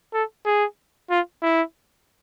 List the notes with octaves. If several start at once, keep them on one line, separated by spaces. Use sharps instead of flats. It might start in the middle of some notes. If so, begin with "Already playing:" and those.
A4
G#4
F4
E4